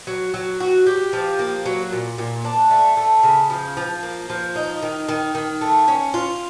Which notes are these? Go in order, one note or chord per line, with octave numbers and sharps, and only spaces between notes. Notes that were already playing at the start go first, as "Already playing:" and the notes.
F#3
F#3
F#4
G4
F3
A#3
F#3
A#2
A#2
D4
A3
A3
C#3
F3
F3
A#3
F3
D#4
D#3
D#3
D#3
A3
C#4
F4